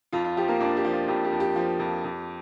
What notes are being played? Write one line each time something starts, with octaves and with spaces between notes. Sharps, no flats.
F2 F4
F4
F3 G4
A#3 A#4
F2 D4 D5
G4
F3
F4
F2 G4
G4
F2
G4
F3
F2
F2